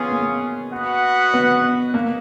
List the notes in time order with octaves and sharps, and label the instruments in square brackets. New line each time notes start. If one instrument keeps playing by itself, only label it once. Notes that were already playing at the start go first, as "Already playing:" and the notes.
Already playing: [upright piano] B3 [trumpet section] C#4 F4 G#4
[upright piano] A#3
[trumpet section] F#4 B4 D#5 F#5
[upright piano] B3
A#3